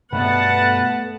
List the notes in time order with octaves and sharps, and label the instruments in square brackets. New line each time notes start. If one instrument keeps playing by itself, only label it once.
[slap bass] G2 B2 [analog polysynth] A3 B3 [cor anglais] B4 [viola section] F#5 A5